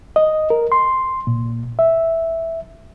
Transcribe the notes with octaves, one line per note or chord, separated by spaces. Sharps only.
D#5
A#4
C6
A#2
E5